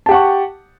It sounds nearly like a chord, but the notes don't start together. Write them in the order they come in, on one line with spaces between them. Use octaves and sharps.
A5 G4 F#5 C#6